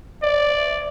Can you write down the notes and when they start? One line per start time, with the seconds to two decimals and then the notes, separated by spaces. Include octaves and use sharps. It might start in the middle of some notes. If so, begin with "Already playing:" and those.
0.23 D5